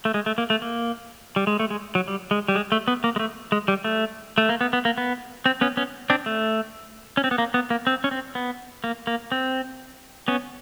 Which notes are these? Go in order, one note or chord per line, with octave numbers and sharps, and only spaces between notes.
A3
G#3
A3
A#3
A3
A#3
G3
G#3
A3
G#3
F#3
G3
G#3
G3
G#3
A3
B3
A#3
G#3
A3
G#3
G3
A3
A3
A#3
B3
B3
A#3
B3
C4
B3 C#4
B3 C#4
C4 D4
A3
C#4
C4
B3
A#3
B3
A#3
C4
C#4
C4
B3
A#3
A#3
C4
B3 C#4